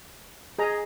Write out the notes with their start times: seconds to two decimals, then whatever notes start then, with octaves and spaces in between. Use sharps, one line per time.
0.59 G#4 D#5 A#5